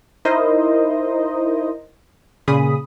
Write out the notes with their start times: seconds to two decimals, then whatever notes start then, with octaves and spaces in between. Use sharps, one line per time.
0.25 D#4 E4 A#4 C5 D#5
2.48 A#2 C#3 G#4 B5 D#6